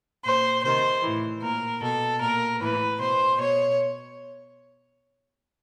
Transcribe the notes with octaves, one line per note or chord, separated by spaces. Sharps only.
A#2 C5
C3 D#3 C5
A2 E3
A#2 A#4
B2 A4
A#2 A#4
A2 E3 B4
B2 C5
B2 C#5